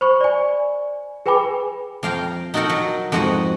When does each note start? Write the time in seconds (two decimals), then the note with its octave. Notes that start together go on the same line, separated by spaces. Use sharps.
0.01 C5 B5 C#6
0.21 D5 G#5
1.26 G#4 B4 G5 G#5 B5 D6
2.03 F2 F5 G5 A#5
2.54 D#4 F#4 A4 A#4 F#5 G5
2.69 F#3
3.12 F2 G#2 F#4 D#5 F#5